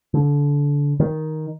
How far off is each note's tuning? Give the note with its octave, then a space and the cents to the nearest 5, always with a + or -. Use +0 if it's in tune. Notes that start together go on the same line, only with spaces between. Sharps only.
D3 -25
D#3 +5